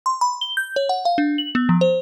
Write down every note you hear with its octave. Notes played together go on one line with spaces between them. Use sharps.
C6
B5
G7
G6
C#5
F#5
F5
D4
F#7
B3
F3
C5